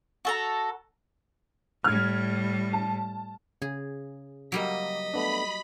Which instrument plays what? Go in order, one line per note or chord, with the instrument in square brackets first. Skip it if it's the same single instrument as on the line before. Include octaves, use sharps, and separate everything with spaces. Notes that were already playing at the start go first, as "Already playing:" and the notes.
[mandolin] F#4 A4 A#5
[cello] A2 G3 [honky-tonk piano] F6 G#6
[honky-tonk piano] A5
[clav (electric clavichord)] C#3 [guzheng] G#4
[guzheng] F#3 G3 A#3 [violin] D#5 B6
[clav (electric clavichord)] A3 B3 D4 [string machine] B5